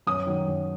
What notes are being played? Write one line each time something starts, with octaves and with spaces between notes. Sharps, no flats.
F#2 D#6
D#3 F#3
F#2